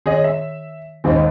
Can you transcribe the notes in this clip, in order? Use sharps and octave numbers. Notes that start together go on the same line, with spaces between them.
D#3 G#4 C#5 D#5
E5
A1 D#2 G#2 D#3 C5 D#5